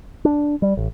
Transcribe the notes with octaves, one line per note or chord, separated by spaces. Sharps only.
D4
G3
A1